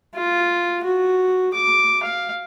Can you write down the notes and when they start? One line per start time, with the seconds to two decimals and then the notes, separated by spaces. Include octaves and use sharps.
0.15 F4
0.84 F#4
1.54 D6
2.03 F5